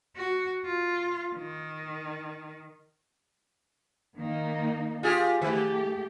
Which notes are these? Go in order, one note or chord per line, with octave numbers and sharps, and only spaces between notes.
F#4
F4
D#3
D#3 A#3 D#4
F4 G4 G#4
D#3 A3 G4